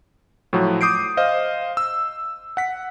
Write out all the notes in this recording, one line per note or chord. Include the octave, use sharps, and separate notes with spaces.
A2 F3 F#3
D6 D#6 G6 C7 D7
C5 D#5 F5
E6
F#5 B6